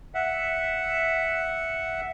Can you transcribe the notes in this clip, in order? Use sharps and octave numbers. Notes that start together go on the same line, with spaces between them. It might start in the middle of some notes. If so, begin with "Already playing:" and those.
E5 F#5